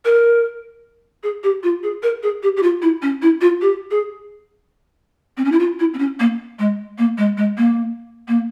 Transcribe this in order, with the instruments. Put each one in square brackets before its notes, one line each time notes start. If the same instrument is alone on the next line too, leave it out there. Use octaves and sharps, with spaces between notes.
[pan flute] A#4
G#4
G4
F4
G#4
A#4
G#4
G4
G4
F4
E4
C#4
E4
F4
G4
G#4
C4
C#4
E4
F4
E4
C4
C#4
A#3
G#3
A#3
G#3
G#3
A#3
A#3